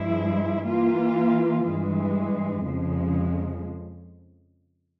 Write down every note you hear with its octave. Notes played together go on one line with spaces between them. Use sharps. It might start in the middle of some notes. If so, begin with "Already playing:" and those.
Already playing: G2 F3 G#3 E4
E3 A#3 F4
G2 E3 G#3
F2 C#3 F3 G#3